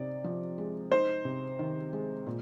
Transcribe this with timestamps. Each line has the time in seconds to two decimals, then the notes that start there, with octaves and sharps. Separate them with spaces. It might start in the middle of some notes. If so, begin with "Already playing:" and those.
Already playing: C3 D#4 D5
0.24 F3
0.58 G#3
0.92 D#4 C5
1.25 C3
1.59 D#3
1.93 G#3
2.27 A#2